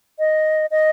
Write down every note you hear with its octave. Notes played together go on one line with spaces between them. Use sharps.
D#5
D#5